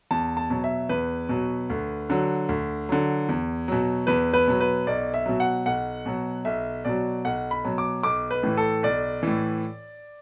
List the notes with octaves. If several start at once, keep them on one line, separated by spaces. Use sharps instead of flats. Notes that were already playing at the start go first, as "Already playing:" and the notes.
E2 A5
A5
B2 F#3
E5
E2 B4
B2 F#3
D2
D3 F#3
D2
D3 F#3
E2
B2 F#3
E2 B4
B4
B2 F#3
B4
B1 D5
E5
B2 F#3
F#5
B1 F#5
B2 F#3
B1 E5
B2 F#3 D5
B1 F#5
B5
B2 F#3
D6
B1 D6
B4
A2 E3
A4
B1 D5
A2 E3